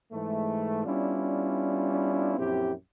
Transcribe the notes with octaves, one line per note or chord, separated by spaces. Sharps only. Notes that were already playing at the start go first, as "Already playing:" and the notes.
G#2 E3 G#3 A3
G3 B3 C#4 D4 E4 F4
A#1 F#2 C4 E4 G4